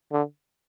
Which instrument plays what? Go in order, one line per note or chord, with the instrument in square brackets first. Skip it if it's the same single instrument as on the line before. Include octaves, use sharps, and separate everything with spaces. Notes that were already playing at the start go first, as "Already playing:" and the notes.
[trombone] D3